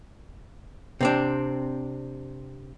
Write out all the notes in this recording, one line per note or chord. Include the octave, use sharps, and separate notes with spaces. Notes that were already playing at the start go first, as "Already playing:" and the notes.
C3 C4 D4